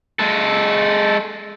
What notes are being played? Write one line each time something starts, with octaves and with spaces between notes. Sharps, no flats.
G#3 A4